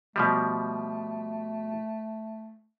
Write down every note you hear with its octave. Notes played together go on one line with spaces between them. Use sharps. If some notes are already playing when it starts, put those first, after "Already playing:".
B2 F3 G3 A3